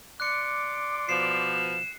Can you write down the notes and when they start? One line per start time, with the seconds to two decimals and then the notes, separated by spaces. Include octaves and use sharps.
0.20 D5 C6 D6 F#6 C#7
1.09 B2 F3 C7 E7